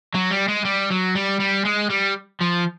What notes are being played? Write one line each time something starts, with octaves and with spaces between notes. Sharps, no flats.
F#3
G3
G#3
G3
F#3
G3
G3
G#3
G3
F3